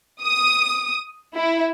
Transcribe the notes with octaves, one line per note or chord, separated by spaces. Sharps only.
D#6
E4